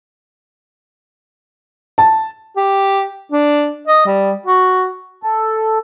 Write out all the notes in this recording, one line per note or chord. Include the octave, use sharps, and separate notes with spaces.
A5
G4
D4
D#5
G3
F#4
A4